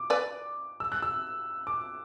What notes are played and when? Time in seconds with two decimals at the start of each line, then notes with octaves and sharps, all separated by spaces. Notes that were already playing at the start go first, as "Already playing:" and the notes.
Already playing: D6
0.10 B4 D5
0.80 E6
0.92 F#6
1.02 E6
1.67 D6